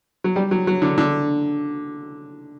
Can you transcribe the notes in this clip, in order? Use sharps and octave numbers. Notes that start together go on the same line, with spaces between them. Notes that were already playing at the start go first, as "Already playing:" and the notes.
F#3
G3
F#3
F#3
D3
D3